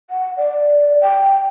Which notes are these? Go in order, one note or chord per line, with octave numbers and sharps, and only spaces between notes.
F#5
D5
G5